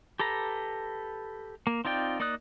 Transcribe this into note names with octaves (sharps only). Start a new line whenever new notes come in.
G4 A4 B4 A#5
A#3
C4 D#4 F4 D5 G5
A#3 D#4 D5 D#6 F#6